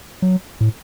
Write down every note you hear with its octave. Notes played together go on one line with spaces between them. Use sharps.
F#3
A2